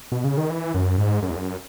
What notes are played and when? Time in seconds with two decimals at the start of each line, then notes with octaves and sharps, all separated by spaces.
0.12 B2
0.24 C#3
0.37 D#3
0.50 E3
0.74 F#2
0.98 G#2
1.22 F#2
1.30 E2
1.36 F#2